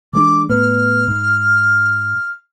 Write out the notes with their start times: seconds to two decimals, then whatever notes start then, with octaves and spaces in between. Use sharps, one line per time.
0.13 E3 G#3 D4 D6
0.49 A2 B3 F6
1.08 G#2